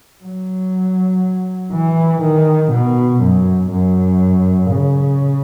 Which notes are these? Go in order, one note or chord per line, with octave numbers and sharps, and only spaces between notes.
F#3
E3
D#3
B2
F#2
F#2
C#3